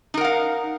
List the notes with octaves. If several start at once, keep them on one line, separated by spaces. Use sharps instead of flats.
D#4 A#4 F5 F#5